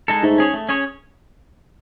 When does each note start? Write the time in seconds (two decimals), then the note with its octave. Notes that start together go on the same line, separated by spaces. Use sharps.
0.08 G#3 D#4 A4
0.23 G#2 A3
0.38 C#4 G#4 C#5
0.54 A3
0.69 C#4 G#4 C#5